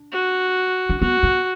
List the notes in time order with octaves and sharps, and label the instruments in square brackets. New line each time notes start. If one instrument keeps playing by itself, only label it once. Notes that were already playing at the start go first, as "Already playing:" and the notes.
Already playing: [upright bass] D4
[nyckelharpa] F#4
[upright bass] D4
[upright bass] B3 [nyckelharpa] F#4
[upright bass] B3